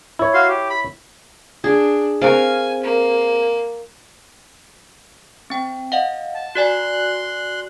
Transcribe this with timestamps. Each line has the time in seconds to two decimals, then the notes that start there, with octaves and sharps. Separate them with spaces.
0.19 E4 C#5
0.34 F#4 F5 C6
0.48 G4
0.70 B5
1.64 D4 G#4
2.22 C4 G#4 A#4 C5 F5 G#5
2.83 A#3
5.50 C4 G5
5.92 D#5 F5 F#5
6.35 A5
6.55 F#4 D5 G#5 C6 F#6